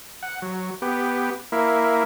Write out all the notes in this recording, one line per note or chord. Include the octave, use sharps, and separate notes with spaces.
F#5
F#3
B3 G4
A#3 E4